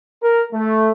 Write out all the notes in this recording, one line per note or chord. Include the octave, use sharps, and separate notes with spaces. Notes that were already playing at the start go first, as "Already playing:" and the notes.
A#4
A3